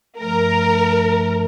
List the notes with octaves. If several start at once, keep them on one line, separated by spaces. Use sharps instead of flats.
G2 F3 A3 A#4